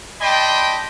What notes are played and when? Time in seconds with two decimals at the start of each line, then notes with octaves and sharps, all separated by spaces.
0.21 D5 D#5 G5 A5 B5 C6